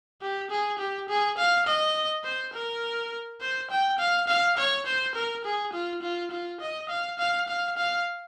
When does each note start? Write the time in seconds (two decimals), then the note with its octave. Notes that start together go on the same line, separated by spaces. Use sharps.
0.21 G4
0.50 G#4
0.79 G4
1.09 G#4
1.38 F5
1.67 D#5
2.24 C5
2.54 A#4
3.41 C5
3.71 G5
3.99 F5
4.28 F5
4.58 C#5
4.86 C5
5.15 A#4
5.45 G#4
5.73 F4
6.02 F4
6.31 F4
6.61 D#5
6.89 F5
7.19 F5
7.48 F5
7.77 F5